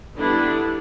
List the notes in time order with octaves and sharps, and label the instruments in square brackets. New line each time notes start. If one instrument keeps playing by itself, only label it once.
[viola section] D3 G3 B3 D4 E4